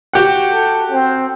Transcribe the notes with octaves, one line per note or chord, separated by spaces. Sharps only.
F#4 G4 F#5
A4
C4